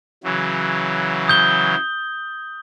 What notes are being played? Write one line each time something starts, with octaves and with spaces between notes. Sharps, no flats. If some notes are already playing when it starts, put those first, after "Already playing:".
C#3 E3 F#3
D#6 G6 G7